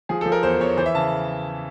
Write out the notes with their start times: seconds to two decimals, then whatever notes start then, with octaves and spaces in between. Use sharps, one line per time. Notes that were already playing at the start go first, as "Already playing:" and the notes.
0.09 F3 G#4
0.21 A4
0.26 F3
0.32 A#4
0.43 E2 C5
0.60 E2 C#5
0.77 E3 C5
0.86 E5
0.95 C#3 A5